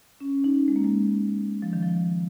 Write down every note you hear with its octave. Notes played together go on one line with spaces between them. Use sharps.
C#4
D#4
G#3
A#3
G#3
F3
D#3
F3